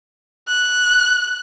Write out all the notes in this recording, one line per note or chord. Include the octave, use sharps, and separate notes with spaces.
F#6